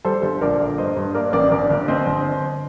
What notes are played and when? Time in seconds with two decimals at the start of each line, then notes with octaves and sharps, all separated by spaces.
0.05 G3 A4 C5
0.23 G1
0.41 A#1 A#4 D5
0.60 A#1
0.78 G2 C5 D#5
0.96 G2
1.14 A#3 A#4 D5
1.33 A1 A#4 D5
1.52 G1 A#4 D5
1.71 G1
1.88 C4 C5 D#5
2.07 G1